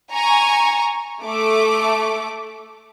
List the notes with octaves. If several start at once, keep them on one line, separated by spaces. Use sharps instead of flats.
G#5 A#5 C#6
A3 D6